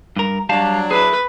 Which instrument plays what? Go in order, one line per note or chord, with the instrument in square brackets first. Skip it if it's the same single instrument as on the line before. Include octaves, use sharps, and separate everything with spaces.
[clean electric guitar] G2 A#4
[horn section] F#3 D4 [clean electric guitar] G3 F5 A5
[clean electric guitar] E4 G#4 [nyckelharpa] B4